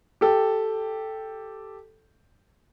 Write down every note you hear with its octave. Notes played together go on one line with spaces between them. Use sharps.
G4 A4